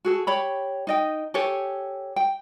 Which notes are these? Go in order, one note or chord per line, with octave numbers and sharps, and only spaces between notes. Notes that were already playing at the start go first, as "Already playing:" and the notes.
F#4 G#4 A4
G4 C#5 B5
D#4 D#5 G5
G4 A4 C#5 G#5
G5